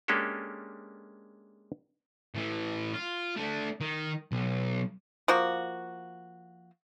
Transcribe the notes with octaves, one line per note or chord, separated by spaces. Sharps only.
G#3 A#3 C#4 D4 G4 A4
A2 E3
F4
A3 D4
D#3
B1
F3 A#3 F#4